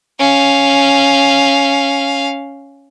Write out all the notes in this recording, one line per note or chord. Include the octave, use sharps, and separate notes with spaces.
C#4 F5